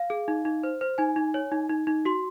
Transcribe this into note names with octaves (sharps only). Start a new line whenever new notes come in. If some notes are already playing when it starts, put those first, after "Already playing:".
Already playing: F5
G#4
D#4
D#4
C5
C5
D#4 G#5
D#4
C#5
D#4
D#4
D#4
F#4 C6